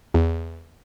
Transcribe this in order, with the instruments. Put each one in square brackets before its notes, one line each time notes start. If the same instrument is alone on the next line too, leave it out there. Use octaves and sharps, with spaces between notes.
[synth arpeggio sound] E2